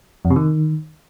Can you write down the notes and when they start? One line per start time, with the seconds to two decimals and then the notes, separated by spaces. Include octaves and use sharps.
0.25 F2
0.30 C3
0.36 D#3